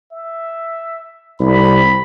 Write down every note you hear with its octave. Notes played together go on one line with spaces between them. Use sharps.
E5
C2 B5